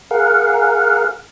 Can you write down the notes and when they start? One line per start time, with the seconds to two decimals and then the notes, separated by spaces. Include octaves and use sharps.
0.11 G#4 A#4 F5 F#5